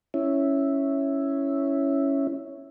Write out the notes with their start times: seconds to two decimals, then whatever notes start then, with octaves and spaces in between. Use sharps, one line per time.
0.14 C#4 E4